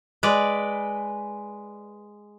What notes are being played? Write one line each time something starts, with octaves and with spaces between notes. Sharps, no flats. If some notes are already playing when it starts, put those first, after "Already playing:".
G#3 B4 D5